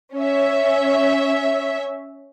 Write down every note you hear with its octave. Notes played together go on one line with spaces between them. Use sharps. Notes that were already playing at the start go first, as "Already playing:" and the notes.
C#4 C#5 E5